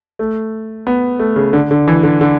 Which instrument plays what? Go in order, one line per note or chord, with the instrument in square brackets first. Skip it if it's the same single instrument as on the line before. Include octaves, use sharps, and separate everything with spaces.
[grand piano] A3
B3
A3
C#3
D3
D3
E3
D3
D3